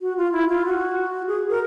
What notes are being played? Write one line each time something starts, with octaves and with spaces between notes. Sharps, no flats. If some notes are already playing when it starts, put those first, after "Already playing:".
F#4
F4
E4
F4
F#4
G#4
A#4